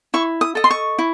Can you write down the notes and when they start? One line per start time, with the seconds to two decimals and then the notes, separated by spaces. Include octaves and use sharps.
0.14 E4 C#6
0.41 D#6
0.55 A4 D#5
0.64 C6
0.71 C#6
0.99 E4